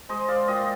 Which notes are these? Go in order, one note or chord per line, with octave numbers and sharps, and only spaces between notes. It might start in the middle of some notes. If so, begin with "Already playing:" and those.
G#3 C5 D#5
D5 F5
A#2 D#5 G5